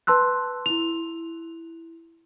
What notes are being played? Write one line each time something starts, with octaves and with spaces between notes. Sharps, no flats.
B4 A5 C6 E6 F#6
E4 F7